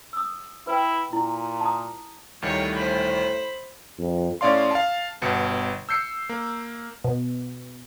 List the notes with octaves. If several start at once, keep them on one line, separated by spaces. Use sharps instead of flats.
D#6 E6
E4 B4 G5
A#2 E4
A5 A#5 D#6
D2 A2 D#3 G3 C#5
C5 B5
F2
A2 C#4 D5 F5 C6
F5 A5
G1 B2 C#7
E6 G6 C7 C#7
A#3
B2